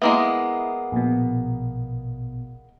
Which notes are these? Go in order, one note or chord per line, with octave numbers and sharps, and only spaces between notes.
G#3 A#3 B3 E4
A#1 B2